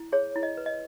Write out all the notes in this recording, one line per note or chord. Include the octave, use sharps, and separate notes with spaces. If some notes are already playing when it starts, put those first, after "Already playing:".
Already playing: E4
G#4 C#5
E4
D#5
B4
D#5